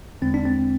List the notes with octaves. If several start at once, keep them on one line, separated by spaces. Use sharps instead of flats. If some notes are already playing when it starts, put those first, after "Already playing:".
E2 D3 G#3 C4
D4
C4